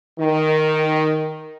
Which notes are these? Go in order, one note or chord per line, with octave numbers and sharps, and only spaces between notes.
D#3